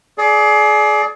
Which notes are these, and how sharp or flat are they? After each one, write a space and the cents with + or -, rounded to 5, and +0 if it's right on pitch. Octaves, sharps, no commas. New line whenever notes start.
G#4 +30 D5 +0